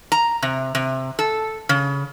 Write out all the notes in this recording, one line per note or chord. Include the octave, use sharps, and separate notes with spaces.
A#5
C3
C3
A4
C#3